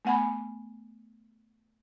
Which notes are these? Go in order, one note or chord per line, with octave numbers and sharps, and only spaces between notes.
A3 B3 F#5 G#5 B5